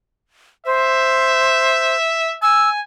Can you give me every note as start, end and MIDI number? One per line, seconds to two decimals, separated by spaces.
0.66 1.97 72
0.66 2.34 76
2.42 2.81 80
2.42 2.70 88